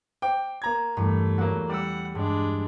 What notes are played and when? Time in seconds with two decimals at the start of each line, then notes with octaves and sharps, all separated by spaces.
0.22 C5 G5 D6
0.62 A#3 A#5 G#6
0.97 E2 G2 A3
1.38 F#3 A#3 F#4 F#5
1.69 G3 F#5 D6 E6
2.15 G2 G#3 D4